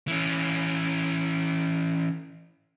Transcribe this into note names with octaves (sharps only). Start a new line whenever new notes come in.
E3 C#4